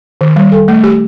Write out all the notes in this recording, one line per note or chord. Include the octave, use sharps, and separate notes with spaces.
D#3
G3
A4
A3
G4